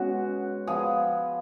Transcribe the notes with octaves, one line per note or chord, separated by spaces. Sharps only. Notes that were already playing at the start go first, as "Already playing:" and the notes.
Already playing: B2 G#3 C#4 F#4
F3 B3 G#4